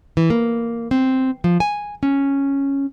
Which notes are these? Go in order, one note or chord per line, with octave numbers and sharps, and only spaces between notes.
E3
A#3
C4
F3
G#5
C#4